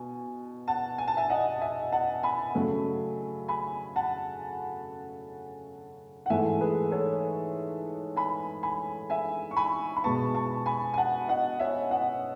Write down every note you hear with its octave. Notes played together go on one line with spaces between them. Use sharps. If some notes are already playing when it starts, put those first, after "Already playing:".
Already playing: B2 G#5
F#5 A5
G#5
A5
E5 G#5
D#5 F#5
E5 G#5
F#5 A5
G#5 B5
C#3 F#3 A3
G#5 B5
F#5 A5
F#5
G#2 E3 A3 E5 G#5
G#4 B4
A4 C#5
G#5 B5
G#5 B5
E5 G#5
C#6
G#5 B5
B5
B2 G#3 B3 A5 C#6
A5 C#6
G#5 B5
G#5
F#5 A5
D#5 F#5
C#5 E5
D#5 F#5